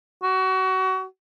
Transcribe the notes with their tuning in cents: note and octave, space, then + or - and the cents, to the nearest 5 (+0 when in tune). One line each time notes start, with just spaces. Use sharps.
F#4 +25